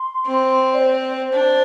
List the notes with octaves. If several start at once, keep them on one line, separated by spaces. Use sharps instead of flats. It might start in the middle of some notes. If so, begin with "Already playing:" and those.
Already playing: C6
C4
D5
C5
D4